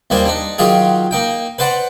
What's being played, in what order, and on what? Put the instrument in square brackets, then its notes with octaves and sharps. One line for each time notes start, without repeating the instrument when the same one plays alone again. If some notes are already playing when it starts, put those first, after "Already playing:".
[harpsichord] D#2 G3 A#3 C5 G#5
D4 D#4
D#3 F#3 F4 G4 G#4
A#3 D#4 G5
B4 C5 D5 F#5